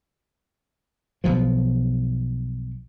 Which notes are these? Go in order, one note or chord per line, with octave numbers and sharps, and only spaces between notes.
B1 B2 F3